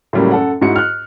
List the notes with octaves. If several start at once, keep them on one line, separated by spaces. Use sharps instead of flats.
A2 C#3 F#3 G3 A#3
F#2 A4 F#5
G#2 E4 F#4 C#7
F6 F#6